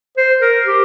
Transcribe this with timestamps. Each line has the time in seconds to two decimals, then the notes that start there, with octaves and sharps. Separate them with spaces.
0.17 C5
0.41 A#4
0.65 G4